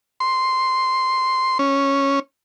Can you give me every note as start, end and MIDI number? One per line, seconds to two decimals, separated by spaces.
0.20 1.58 84
1.59 2.20 61